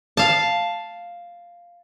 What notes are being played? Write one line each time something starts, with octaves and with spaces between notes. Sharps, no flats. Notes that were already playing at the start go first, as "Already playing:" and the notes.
F5 A5